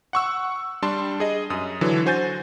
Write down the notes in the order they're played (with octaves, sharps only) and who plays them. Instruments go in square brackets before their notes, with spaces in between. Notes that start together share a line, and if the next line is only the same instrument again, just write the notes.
[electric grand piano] F#5 C#6 E6
G3 D4 A5 C6
G#4 D#5
F#2 D#6
D3 E3 F#3
F#4 C5 G#5 G6 A6